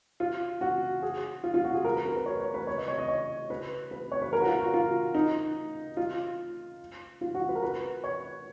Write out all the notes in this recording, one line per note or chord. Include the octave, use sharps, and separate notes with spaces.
F4
F#4
G#4
F4
F4
F#4
G#4
A#4
B4
A#4
B4
C#5
C#5
B4
C#5
D#5
C#5
D#5
C#5
B4
B4
C#5
B4
A#4
F#4
F4
F#4
F4
D#4
F4
F4
F#4
B4
A#4
B4
C#5